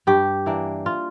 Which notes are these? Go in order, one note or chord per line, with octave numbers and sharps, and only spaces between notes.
G2 G4
E3 A#3 D4
F4